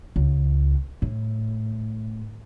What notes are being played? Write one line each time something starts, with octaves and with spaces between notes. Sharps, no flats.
C#2
A2